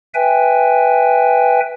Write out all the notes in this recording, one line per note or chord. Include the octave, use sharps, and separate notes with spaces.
B4 E5 G5 G#5